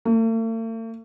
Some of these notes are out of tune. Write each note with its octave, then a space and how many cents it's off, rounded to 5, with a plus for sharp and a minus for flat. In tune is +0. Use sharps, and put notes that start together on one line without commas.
A3 +45